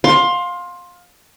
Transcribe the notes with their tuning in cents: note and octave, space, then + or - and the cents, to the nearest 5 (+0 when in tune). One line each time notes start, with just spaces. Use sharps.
F5 +25 C6 +15